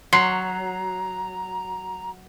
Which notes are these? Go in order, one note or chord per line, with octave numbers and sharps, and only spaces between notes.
F#3 A#5 C6 C7